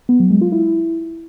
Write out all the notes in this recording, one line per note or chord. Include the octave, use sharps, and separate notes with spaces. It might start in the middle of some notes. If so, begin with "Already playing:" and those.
B3
F#3
G#3
F4
E4